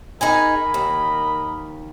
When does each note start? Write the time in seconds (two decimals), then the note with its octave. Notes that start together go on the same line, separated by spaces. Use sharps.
0.21 D#4 G#4 A#4 D#5 G#5 B5
0.74 D#2